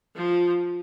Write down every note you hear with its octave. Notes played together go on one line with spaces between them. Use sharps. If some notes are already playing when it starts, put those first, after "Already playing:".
F3